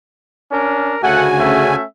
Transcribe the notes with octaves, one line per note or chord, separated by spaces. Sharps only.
C#4 D4 A#4
D2 C#3 A3 F#4 F#5 G#5
A3 C#4 E5